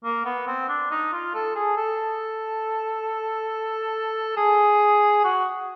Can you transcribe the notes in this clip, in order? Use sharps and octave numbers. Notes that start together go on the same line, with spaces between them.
A#3
B3
C4
D4
D#4
F4
A4
G#4
A4
G#4
F#4